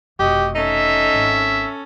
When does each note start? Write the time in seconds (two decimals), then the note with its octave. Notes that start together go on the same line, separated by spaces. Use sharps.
0.19 F1 B2 F#4 G4 D#5
0.55 C#4 D#4 A4 E5
1.14 G#1